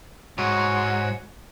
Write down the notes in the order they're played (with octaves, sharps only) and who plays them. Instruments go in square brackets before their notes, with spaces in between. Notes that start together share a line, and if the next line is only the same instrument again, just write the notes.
[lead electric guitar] G#2 [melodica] F#4 C#5